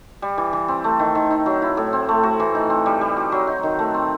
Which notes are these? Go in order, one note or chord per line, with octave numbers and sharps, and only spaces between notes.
G3
E3
E3
C4
A3
D#3
D#3
D#4
F#3
E4
A2
C4
A3
F#4
E3
D#4
C4
G3
G3
F#4
F#3
D#4
D#3
A3
C4